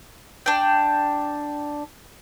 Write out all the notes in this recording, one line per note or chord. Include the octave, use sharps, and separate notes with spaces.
D4 G5